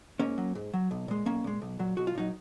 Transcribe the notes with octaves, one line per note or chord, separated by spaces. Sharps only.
G#2 A#3 C#4
F#3
G#2
F#3
B1
A#2 G#3
B1 A#3 C#4
A#2 G#3
B1
A#2 F#3
B1 F#4
F4
A#2 F#3 D#4